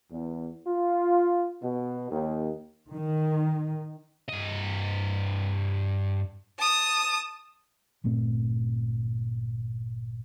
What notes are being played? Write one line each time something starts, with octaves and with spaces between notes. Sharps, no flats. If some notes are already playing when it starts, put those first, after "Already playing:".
E2
F4
B2
D#2
D#3
G2 D#5
A5 D#6
G1 A#2 A3 C4